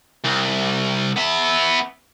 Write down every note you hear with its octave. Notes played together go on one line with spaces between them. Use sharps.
C2
B3 E5